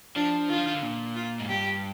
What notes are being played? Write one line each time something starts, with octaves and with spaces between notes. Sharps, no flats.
F3 D4
D#3 F4
F3
D#3
D3
A#2
F4
G#2
G2 G4